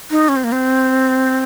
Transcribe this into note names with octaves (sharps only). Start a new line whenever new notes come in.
D#4
C#4
C4
A#3
C4